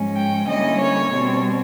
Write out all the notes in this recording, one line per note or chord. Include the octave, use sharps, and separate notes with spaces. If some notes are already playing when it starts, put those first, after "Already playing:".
Already playing: G#2 F3 G#3 C#4
G5
D3 G3 A#3 C#4 E4 D#5
C#5
B2 G3 C4